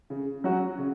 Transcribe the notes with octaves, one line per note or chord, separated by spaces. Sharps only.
C#3
F#3 C#4 F#4
C#3